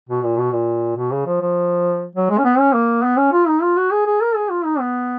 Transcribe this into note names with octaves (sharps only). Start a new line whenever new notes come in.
B2
A#2
B2
A#2
B2
C#3
F3
F3
F#3
G#3
C#4
B3
C#4
A#3
B3
C#4
F4
D#4
F4
F#4
G#4
G#4
A#4
G#4
F4
D#4
B3